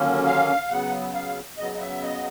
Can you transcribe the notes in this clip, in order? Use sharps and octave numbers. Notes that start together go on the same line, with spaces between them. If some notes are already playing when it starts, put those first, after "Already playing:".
Already playing: D#2 D3 F#3 A#3 C#4
F5
C#3 F#3 B3 F#5
F5
C#3 F#3 B3 D#5
D#5
E5
D#5